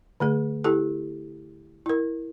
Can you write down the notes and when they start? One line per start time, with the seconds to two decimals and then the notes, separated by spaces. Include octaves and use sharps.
0.20 D3 A3 G#4
0.64 E4 G4 A4
1.86 E4 A#4